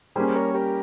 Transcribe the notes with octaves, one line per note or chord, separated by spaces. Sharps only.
G3 A#3 C#4 G#4 C5
A#4 C#5
G4 A#4